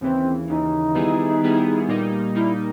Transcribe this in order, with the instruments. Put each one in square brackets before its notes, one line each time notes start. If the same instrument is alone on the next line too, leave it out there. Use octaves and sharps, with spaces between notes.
[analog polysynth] D#2 C#3 E3 [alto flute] C4
[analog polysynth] D#2 C#3 E3 [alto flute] D#4
[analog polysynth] D#3 G3 B3 E4 G#4
D#3 G3 B3 E4 G#4
A#2 G3 A#3 D#4
[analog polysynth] A#2 G3 A#3 D#4 [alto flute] E4